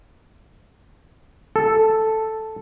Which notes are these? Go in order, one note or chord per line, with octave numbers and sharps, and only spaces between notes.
A4